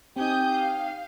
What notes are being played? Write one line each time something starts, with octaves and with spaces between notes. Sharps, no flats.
C4 D#4 G4 G#5 D#6 G6
F5